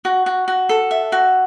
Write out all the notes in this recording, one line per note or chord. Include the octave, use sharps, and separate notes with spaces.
F#4
F#4
F#4
A4
E5
F#4